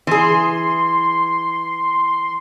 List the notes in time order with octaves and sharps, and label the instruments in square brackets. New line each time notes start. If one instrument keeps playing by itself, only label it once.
[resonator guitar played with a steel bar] E3 G#4 [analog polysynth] C6